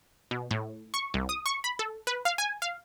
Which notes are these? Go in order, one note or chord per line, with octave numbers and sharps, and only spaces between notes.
B2
A2
C#6
C2
D#6
C#6
B5
A4
B4
F5
G#5
F5